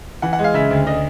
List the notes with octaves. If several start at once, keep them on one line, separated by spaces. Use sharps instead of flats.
E3 F#5
F#5
G#3
F5
C#3 E5
D2
D3 D#5